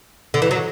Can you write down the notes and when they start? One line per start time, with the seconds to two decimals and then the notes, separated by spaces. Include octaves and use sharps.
0.34 D3
0.42 E3
0.51 F#3